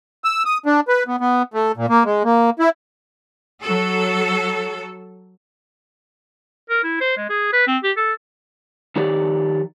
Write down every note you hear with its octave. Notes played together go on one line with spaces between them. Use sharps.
E6
D#6
D4
B4
B3
B3
A3
A#2
A#3
G#3
A#3
E4
F#3 A4
A#4
E4
C5
G#3
G#4
B4
C4
G4
A4
D#3 F3 D#4 G4 C#5 D5